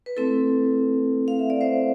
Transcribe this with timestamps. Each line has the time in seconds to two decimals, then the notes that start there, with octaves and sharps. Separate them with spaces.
0.06 B4
0.17 A3 C4 E4 A4
1.28 F5
1.39 E5
1.50 D5
1.61 C5 E5